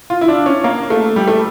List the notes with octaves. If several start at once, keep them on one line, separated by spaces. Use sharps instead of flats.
F4
E4
D4
C#4
A#3
A3
G3
A3